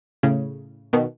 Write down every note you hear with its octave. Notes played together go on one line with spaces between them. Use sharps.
A2 C#3
B2 D#3